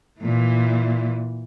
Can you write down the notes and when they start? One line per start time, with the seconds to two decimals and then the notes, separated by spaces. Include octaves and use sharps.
0.20 A#2 E3